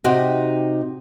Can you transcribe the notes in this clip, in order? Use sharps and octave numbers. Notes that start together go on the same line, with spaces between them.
C3 D#4 F#4 G4